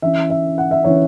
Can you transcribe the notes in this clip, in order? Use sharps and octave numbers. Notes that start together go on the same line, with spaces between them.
E3 C#4 E5
E5
F#5
E5
E3 C#4 C#5